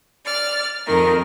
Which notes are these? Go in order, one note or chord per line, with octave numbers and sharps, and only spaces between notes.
D5 F6
F2 D#3 A#4